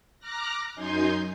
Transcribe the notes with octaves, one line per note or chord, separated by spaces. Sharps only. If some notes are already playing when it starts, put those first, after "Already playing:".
A#5 D6 F6 F#6 A#6
F#2 D#4 G#5 C6 G6